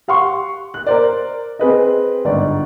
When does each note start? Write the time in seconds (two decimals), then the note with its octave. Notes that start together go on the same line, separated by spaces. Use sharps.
0.08 G4 F5 F#5 C6 C#6
0.74 F#6
0.87 A#4 C5 D5
1.59 C4 G#4 B4 D#5
2.25 G1 G#2 D5